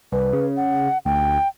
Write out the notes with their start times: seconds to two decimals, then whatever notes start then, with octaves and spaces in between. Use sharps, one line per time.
0.12 C2 B4
0.33 C#3
0.57 F#5
1.05 D2 G5